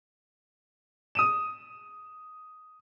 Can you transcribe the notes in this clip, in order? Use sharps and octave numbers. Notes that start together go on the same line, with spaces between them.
D#6 D#7 E7